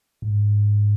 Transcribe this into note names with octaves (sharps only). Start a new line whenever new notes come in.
G#2